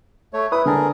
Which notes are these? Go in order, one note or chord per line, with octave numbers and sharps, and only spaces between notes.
A3 C#5
E4 B4 D#6
D3 G#4 A#4 A5